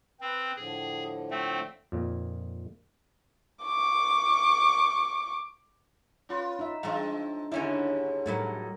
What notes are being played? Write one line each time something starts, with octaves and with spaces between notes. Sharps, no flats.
C4 B4 G5
A2 D3 F3 G#4
A3 C4
F2 A#2 D#3
C#6 D6
C#4 F4 B4
D#4 E5
E3 G#3 C4 D4 F5
D#2 G#2 D3 C#4 E4
A2 F#3 A3 A#4 B4